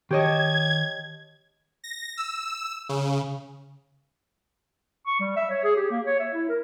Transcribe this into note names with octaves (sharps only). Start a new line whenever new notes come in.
D#3 G4 C#5 D#5 G5 A5 G#6
A#6
E6
C#3
C#6
G3
E5
C#5
G#4
G4
A#3
C#5
E5
E4
A#4